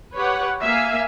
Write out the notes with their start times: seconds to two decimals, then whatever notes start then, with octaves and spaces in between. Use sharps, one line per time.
0.16 G4 B4 C#5 F#5
0.61 A#3 E5 F5 G#5